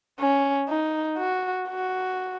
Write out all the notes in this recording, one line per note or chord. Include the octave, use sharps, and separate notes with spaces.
C#4
D#4
F#4
F#4